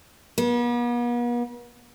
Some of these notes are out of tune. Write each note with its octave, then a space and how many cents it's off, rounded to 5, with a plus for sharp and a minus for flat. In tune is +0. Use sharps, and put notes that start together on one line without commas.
B3 -45